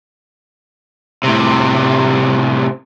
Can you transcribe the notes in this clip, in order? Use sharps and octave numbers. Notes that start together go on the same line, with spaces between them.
A2 C3